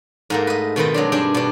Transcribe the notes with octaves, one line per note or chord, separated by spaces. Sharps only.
G#2 A3 A#3
B4 D#5
B2 D#3 A3 C4 B4
F#3 G#3 D4
G2 D4 G#4 G5
B2 D4